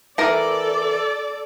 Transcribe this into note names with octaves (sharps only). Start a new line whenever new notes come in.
E3 A4 A#4 D5